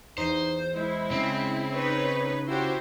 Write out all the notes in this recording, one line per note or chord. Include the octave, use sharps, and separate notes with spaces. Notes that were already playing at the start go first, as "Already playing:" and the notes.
E2 D#4 C5
G#3 E4
C#3 C4
D#4 B4 C#5
E4 F#4 G4 C5